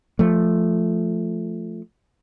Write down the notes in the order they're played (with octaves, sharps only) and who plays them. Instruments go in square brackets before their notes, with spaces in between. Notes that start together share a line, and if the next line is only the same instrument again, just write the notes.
[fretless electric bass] F3 A3